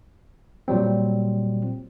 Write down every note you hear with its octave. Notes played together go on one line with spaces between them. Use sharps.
A#2 F#3 G3 C4